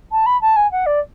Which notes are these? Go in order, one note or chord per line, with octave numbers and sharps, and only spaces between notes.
A5
B5
A5
G#5
F#5
D5